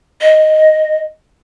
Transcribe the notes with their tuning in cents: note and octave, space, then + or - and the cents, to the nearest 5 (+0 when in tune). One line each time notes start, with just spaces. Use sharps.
D#5 +0